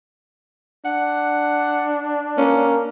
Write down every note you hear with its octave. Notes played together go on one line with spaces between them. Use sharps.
D4 F#5
A#3 C#4